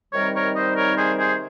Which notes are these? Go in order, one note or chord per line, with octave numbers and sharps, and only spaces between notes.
C3 D#3 G3 C4 D#4 A#4 C#5
A#4 C#5
C5 D#5
A#4 C#5
G#4 C5
G#4 C5